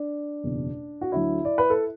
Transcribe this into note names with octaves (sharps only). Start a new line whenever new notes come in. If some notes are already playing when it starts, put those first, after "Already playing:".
Already playing: D4
F#1 E2 B2
F#4
D2 D3 F#3 E4
D5
B4
A4